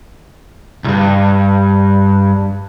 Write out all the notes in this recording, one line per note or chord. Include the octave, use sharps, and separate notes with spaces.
C2 G2